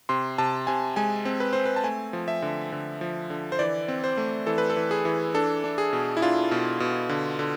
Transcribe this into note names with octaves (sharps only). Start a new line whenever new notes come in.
C3 C6
C3 A5
C3 G#5
G#3 G#5
C4
B4
C4 C5
B4
A5
A3 G#5
F3
E5
D3
D3
F3
D3
C5
E3 D5
C4
C5
A3
E3 A4
B4
A4
E3
G#4
E3
D4 A4
D4
G#4
B2
E4
D4 F4
B2
B2
D3
D3